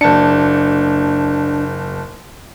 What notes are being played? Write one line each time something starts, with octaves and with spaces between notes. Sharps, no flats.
F#1 D4 A5 C#7